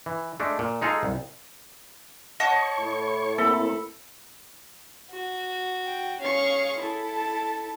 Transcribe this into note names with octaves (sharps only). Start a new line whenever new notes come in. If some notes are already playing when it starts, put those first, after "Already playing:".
E3
G#3 A3 D4
A#2
G#3 D#4 F4 G#4 A4
C2
C#5 D#5 F#5 A5 C#6
A2 E4
A#3 C4 A4 B5
F#4
G5
C#4 G#4 F5 C#6
E4 A4
A5